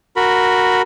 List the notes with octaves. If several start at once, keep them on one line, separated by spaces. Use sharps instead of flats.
F#4 A#4 B5